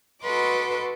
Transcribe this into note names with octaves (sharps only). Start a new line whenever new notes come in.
F#4 A4 B4 D#5 C6 D6